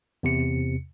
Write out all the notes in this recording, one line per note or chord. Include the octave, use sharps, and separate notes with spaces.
E2 C3 C#7